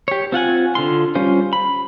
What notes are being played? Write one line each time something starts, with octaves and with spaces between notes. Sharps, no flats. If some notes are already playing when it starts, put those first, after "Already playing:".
G4 C#5
C4 F4 F#5 G#5
D3 F4 C6
G3 C#4 F4 C5
B5